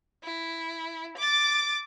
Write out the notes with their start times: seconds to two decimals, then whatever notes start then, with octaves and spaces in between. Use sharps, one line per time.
0.24 E4
1.17 D6 A6